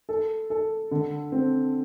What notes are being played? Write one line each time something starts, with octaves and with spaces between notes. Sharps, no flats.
A4
A4
D3
C4